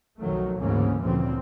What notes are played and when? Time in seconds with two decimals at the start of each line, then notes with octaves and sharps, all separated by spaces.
0.21 B1 F2 D#3 F#3 A3
0.59 D2 G#2 C#3 E3 A#3 C#4
1.02 D2 A#2 C#3 E3 F3 C4